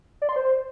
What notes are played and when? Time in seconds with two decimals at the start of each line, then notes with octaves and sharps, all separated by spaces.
0.22 D5
0.29 C6
0.36 C5